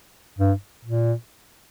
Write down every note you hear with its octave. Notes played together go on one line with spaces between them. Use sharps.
G2
A#2